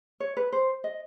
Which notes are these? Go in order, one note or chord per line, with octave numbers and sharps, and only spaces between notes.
C#5
B4
C5
D#5